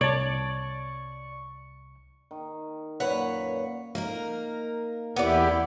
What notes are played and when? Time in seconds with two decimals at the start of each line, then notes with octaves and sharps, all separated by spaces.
0.01 C2 C#5 D5 A5 C#6
2.31 D#3
3.00 F#2 A#2 B4 C#5 F#5
3.95 A#3 D#4 A#4
5.16 E2 B3 E4 G4 D5